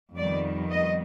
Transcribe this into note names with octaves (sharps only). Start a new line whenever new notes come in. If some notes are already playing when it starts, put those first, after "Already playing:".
F2 D#3 G3 B3 D5
D#5